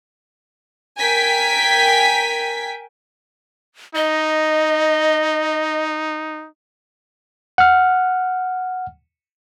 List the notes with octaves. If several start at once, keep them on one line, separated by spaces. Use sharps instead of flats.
A#4 G5 G#5 B6
D#4 D#5
F#5 F6